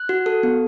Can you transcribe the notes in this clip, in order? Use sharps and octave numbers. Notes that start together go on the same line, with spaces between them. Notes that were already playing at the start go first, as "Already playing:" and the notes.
Already playing: F#6
F#4
A4
B3